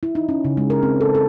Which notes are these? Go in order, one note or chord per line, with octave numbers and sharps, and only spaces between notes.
E4
D#4
C#4
C#3
G#3
A#4
C4
A4
A4